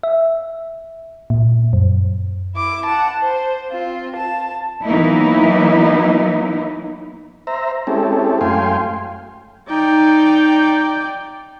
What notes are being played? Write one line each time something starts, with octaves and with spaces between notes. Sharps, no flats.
E5
A#2
F#2
E4 D6
F#5 A5
C5
C4 F4
A5
E3 F#3 A#3 B3 D#4 E4
C5 E5 A#5
G#3 C4 C#4 E4 G4 A4
F#2 A3 F5 G5 G#5 C6
D#4 D5 G5